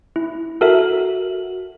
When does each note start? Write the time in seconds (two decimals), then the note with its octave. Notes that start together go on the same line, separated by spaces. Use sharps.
0.16 E4
0.61 F#4 A4 A#4 E5